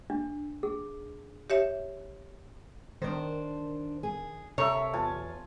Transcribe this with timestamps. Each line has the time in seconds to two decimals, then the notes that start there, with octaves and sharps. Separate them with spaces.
0.10 D4
0.63 G#4
1.50 G4 C#5 E5
3.02 D#3 D4 C5
4.03 G#4
4.58 C3 A4 A#4 C#5 E5
4.93 E2 F4 G#5 A5